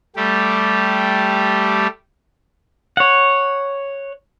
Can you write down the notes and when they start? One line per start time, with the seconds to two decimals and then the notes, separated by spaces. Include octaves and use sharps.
0.16 G3 A3 G4
2.97 C#5 F#5